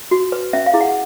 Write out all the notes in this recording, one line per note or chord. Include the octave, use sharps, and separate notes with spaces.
F#4
B4
C#4 E5
F5
E4 G#4
F#5